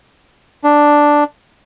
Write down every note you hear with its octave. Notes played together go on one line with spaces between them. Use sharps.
D4